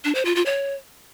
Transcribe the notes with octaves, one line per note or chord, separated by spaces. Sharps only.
D4
C5
F4
F4
C#5